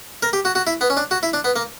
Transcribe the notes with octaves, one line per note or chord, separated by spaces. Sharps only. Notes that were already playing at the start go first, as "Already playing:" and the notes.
A#4
G4
F#4
F#4
E4
B3
C#4
D4
F#4
E4
D4
B3
A#3